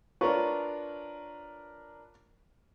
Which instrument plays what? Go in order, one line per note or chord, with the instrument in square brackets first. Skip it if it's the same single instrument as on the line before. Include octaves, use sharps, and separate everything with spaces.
[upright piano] D4 A#4 B4 [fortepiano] F4 C#5 C#6